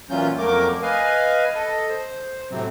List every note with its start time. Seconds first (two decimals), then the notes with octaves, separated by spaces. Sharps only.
0.10 A#2 E3 F#3 C#4 F4 G6
0.38 F2 F#3 A3 A#3 A#4 D6
0.82 B4 D#5 F5 G#5
1.55 A4 D#5
1.89 C5
2.51 A2 C3 F#3 C4